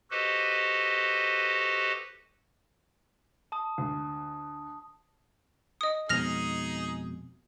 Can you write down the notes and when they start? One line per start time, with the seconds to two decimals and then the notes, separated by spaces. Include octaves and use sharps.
0.11 F#4 G4 A4 B4 C5 D#5
3.52 A5 D#6
3.78 D2
5.81 D#5 D#6
6.09 F2 B2 G#3 D#4 G#4 F6 A#6 F7